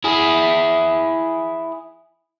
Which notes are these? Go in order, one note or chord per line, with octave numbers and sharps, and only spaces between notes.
E4 G#4